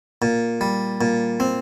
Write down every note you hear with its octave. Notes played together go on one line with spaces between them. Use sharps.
A#2
G3
A#2
C4